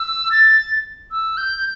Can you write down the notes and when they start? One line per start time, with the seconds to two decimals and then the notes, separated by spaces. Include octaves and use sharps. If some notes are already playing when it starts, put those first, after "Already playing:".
Already playing: E6
0.31 A6
1.11 E6
1.37 G6